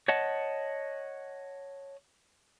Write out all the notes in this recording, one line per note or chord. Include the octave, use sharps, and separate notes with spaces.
C#5 D#5 F#5 A5